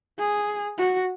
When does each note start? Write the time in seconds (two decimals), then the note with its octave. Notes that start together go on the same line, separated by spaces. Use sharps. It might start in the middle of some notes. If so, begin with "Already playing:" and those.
0.19 G#4
0.78 F#4